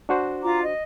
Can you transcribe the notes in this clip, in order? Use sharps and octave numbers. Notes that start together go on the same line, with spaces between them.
D4 F#4 C5
F4 A#5 D6
D#5